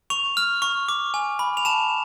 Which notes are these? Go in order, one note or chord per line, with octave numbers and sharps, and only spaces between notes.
C#6 F7
F6
C#6
D6
G#5
B5
F7
A5 E7